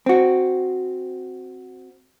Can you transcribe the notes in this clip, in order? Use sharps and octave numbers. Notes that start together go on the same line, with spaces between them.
C4 F#4